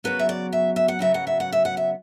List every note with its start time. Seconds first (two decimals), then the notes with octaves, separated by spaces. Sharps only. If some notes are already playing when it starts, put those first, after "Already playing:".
0.04 C#3 F#3 B3 B4
0.19 E5
0.29 D5
0.53 E5
0.76 E5
0.88 F#5
0.99 C#3 F#3 B3 E5
1.14 F#5
1.27 E5
1.40 F#5
1.52 E5
1.65 F#5
1.77 E5